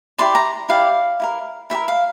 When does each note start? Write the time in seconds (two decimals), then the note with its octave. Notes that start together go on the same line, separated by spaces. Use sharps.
0.18 E4 G4 D5 C6
0.35 A#5
0.69 E4 G4 D5 F5
1.20 E4 G4 A#4
1.70 E4 G4 A#4 E5
1.88 F5